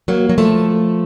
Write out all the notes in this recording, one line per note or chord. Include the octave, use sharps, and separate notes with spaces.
F#3 A#3
F#3
F3 A3